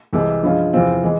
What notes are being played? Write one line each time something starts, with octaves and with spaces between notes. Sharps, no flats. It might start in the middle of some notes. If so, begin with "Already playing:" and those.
C2 C3 E3 G#3
G2 F3 G#3 C#4 F4
E2 C3 F3 C4 F4
E3 G#3